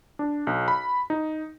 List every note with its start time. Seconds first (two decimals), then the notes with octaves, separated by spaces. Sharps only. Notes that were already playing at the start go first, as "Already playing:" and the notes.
0.19 D4
0.47 B1
0.68 B5
1.10 D#4